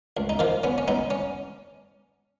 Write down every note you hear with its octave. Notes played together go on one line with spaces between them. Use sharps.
C#2
D#4
D#3 F3 F4
B3 C#4
C#4
B3 D#4
C#4